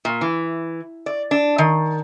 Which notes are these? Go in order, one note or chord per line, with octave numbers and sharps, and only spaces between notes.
A#2
E3
D5
D4
D#3